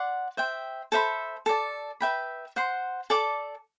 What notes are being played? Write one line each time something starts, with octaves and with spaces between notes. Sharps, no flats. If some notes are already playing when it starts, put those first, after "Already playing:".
Already playing: D5 F#5 C6
C5 E5 G5
A4 C5 E5 B5
A4 D5 A5
B4 E5 G5 B5
C5 F#5 C6
A4 D5 A5 D6